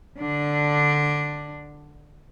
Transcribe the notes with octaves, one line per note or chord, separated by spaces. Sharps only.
D3 D4